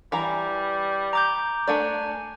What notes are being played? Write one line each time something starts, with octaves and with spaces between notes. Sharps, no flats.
E3 G3 A#5
A#5 D6 G6
A3 D4 D5 G#5